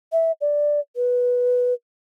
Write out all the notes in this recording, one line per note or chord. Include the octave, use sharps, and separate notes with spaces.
E5
D5
B4